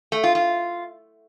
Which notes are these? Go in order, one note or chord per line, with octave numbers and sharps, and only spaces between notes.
A3
F4
F4